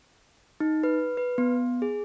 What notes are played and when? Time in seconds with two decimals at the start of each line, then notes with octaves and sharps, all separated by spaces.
0.60 D#4
0.84 B4
1.17 B4
1.38 B3
1.82 G#4